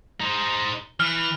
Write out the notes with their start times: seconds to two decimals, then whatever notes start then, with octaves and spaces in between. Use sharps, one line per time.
0.20 D#4 C5
1.00 E3 F6